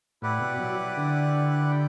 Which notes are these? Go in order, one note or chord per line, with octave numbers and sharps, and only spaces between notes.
A2 E4 G4 B4 D5 F#5
B2
F#3
D3
G5